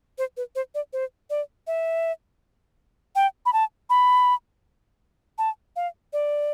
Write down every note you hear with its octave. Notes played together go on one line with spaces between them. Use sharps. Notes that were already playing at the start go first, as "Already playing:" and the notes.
C5
B4
C5
D5
C5
D5
E5
G5
B5
A5
B5
A5
F5
D5